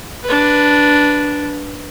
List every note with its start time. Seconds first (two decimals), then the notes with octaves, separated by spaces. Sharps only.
0.24 D4 B4